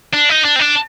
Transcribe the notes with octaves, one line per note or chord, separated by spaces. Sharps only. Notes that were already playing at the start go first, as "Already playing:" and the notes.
D4
D#4
D4
C4
D4